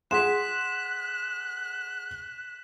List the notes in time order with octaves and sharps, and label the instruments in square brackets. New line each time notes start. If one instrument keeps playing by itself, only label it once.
[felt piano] G#4 F#5 C6 [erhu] F#6 [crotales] B6 E7